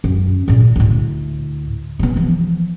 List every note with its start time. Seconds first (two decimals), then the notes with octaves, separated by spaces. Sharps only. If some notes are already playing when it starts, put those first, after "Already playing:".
0.04 F#2
0.48 A#2 C#3
0.76 D2 A2
1.99 C3 B3
2.16 E3 F3